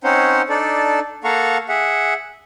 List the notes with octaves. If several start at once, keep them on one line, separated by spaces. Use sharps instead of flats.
C4 C#4 D#4 C5 C#5 F#5
D4 D#4 A4 D5
A#3 A4 F5 F#5 A#5 C#6
G#4 E5 F#5